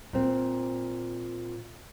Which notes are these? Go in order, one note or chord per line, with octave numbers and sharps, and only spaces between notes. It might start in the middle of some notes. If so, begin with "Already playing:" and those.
A#2 C4